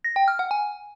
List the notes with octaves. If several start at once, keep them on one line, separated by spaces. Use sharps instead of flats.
A#6
G5
F6
F#5
G#5